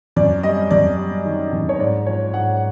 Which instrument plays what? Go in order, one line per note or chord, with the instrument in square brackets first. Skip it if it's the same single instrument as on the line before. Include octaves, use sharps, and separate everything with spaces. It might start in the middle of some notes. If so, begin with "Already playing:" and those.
[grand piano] F#2 D5
G3 D#5
F#2 D5
G3
D#3
F#2
C#5
G#2 D5
F3 C#5
G#2 F#5